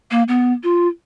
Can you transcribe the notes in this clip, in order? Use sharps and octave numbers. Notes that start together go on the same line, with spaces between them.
A#3
B3
F4